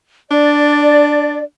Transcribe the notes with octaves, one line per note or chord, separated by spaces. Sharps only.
D4 D5